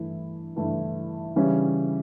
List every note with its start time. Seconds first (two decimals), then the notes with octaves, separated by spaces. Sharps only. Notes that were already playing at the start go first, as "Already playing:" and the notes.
Already playing: G2 E3 A3 E4
0.56 G2 E3 A3 E4
1.36 C#3 E3 G3 C#4